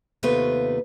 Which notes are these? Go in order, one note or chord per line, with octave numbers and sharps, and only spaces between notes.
D#2 C3 A3 B3 F4 B4